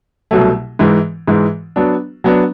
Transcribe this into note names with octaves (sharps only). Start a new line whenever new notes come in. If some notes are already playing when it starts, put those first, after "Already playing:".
C2 B2 F#3 A3
G#2 E3 G#3
G#2 E3 G#3
F#3 B3 D4
F#3 B3 D4